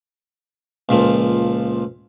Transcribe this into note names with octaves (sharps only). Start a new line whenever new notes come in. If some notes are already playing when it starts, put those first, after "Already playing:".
C#2 A#2 F3